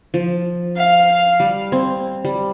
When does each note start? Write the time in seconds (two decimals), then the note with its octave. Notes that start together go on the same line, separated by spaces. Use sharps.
0.14 F3
0.77 F5
1.40 G3
1.72 C4
2.25 G3